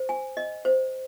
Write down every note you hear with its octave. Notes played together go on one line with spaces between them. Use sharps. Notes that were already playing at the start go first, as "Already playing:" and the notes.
Already playing: C5
G#5
D#5
C5